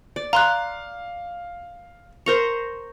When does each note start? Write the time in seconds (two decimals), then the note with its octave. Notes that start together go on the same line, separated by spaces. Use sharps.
0.16 D5
0.33 F5 A#5 C6 F#6
2.26 A#4 C5 A#5 C#6 F7